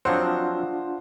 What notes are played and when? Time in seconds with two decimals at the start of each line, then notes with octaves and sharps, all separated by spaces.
0.05 F3 F#3 C4 D4 F4 C5 F#5